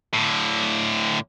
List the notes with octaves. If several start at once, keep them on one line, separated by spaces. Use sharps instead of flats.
A2 D3